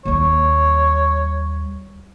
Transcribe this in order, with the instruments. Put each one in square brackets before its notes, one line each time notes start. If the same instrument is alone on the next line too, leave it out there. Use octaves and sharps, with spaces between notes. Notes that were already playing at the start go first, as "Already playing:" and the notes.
[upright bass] D#2 G3 [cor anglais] C#5